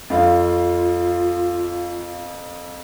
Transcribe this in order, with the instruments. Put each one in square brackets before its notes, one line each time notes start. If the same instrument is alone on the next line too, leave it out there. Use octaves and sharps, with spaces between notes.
[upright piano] F2 F5 [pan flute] F4